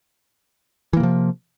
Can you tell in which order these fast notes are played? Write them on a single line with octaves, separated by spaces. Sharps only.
E3 A#3 C3 F3